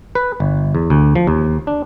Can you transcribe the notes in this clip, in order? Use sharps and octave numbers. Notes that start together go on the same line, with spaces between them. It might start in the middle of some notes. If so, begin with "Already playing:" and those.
B4
G1
E2
D2
F3
D#2
D4